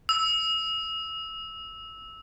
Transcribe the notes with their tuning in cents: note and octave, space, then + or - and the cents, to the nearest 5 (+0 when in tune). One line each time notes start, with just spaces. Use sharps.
E6 -15